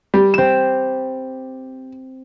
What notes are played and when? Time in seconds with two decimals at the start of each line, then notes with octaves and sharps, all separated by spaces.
0.14 G3
0.34 C4 E7